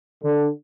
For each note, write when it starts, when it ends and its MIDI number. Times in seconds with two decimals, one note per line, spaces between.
0.23 0.47 50